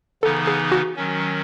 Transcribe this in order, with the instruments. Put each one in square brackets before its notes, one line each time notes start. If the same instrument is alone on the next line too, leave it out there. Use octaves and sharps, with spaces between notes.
[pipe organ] C#3 E3 B3 D#4 [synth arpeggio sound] A4
[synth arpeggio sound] G#4
F#4
[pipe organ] D#3 F#3 C#4